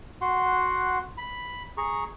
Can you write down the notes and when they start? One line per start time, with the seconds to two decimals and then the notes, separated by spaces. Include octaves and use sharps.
0.21 F#4 F#5 C6
1.18 B5
1.78 G#4 A#5 C#6